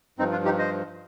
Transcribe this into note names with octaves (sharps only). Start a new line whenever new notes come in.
G2 F3 C4 D#4
D4 F4
D#4 G4
C5 D#5